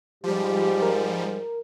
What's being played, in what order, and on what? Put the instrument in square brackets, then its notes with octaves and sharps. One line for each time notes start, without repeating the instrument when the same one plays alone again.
[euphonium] G#2 [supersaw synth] F3 G3 [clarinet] G4
[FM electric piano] A#4